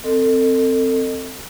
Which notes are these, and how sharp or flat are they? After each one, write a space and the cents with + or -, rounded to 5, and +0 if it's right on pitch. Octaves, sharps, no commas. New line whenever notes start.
C4 +0 A4 +30 D#5 -20